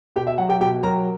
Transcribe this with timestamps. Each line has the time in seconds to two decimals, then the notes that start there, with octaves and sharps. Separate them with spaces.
0.16 B2 G4 G5
0.27 E5
0.38 F#3 F#5
0.49 G4 G5
0.61 B2 G4 G5
0.83 F#3 A#4 A#5